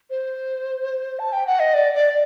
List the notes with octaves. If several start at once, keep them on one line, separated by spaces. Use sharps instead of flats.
C5
A5
G5
F#5
D#5
D5
D5